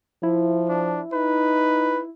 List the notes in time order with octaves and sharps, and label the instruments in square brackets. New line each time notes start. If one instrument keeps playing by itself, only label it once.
[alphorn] F3 [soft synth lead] E4
[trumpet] D4
[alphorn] D#4 [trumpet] B4